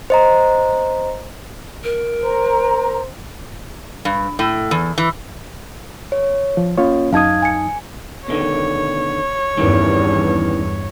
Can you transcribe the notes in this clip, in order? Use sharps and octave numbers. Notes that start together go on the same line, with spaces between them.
C5 D#5 A#5
A#4
C5 A#5
G2
A2
E2
E3
C#5
F3
A#3 C#4 F4 C#5
F#2 D#4 F5 A5 D#6 G#6
G#5 C#7
B2 D3 D#3 C#5
E2 G2 D#3 E3 C#4